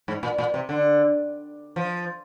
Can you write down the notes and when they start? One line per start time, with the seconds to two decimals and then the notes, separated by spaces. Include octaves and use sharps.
0.08 G#2
0.23 A#2
0.38 A#2
0.54 C3
0.69 D3
1.76 F3